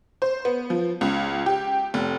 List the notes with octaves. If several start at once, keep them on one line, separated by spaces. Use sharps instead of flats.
C5
B3
F3
C#2
G4
F1